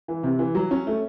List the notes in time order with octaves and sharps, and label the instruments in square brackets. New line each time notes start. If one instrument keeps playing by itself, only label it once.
[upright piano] E3
C3
E3
F#3
C#4
A3